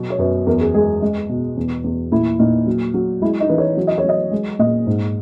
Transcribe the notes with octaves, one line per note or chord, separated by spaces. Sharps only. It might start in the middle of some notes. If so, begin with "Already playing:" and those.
Already playing: B2 F#3
C#5
F#2 B4
E2 A#4
G#4
G#3 G#4
G#3
B2
E2
E2
A#2 E4
A#2 D#4
F#3
F#3
G#3 E4
D#4
E3 B4
C#5
F#3
D#5
C#5
F#3 D#5
G#3
A#2 D#5
G#2